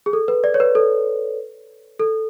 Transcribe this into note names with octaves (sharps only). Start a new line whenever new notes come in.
G#4
A4
B4
D5
C#5
B4
A4
A4